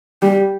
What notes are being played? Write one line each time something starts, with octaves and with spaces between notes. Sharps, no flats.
G3